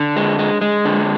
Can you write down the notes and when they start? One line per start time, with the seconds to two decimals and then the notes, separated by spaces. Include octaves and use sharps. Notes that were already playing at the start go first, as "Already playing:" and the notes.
Already playing: D3
0.16 G#3
0.39 G#3
0.61 G#3
0.85 D3